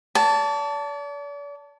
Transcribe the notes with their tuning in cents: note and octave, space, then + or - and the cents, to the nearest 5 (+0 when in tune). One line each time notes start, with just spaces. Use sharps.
D5 -40 A5 +5